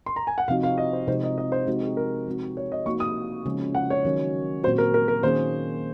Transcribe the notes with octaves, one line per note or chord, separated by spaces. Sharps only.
C6
A#5
G#5
F#5
C3 F3 C4 D#4 F#4 F5
F5
D#5
C5
C3 F3 G#3 D#4 C5
D#5
D#5
C5
G#3 C4 D#4 F#4
G#4
A#4
F3 G#3 C4 F#4
C#5
D#5
F3 A#3 D#4 F#4 C#6
D#6
C#3 F3 G#3 C#4
F#5
C#5
D#3 F#3 C#4
A#2 F#3 C4 F#4 C5
A#4
A#4
A#4
D#3 A#3 C#4 G#4 C5